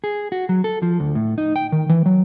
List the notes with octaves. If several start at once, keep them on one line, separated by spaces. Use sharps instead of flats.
G#4
F#4
F#3
A4
F3
D2
A2
D#4
G5
D#3
E3
F#3